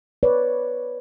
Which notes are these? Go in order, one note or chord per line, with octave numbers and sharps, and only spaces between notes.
B4 C#5 D5